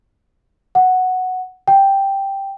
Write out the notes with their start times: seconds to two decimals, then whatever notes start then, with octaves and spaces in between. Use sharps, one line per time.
0.75 F#5
1.68 G5